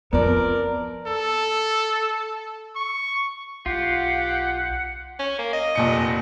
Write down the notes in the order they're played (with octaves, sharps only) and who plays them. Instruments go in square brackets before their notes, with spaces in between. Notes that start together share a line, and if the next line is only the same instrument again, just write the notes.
[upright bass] F2 [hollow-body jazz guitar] F3 B3 [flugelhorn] A#4 [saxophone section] D5
[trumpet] A4
C#6
[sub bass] B1 [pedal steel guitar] F4 [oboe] G4 [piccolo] F#5
[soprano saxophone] C#4
A#3
D#5
[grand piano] F1 A#2 C#7